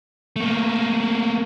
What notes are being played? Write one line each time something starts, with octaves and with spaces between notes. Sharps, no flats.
A3 A#3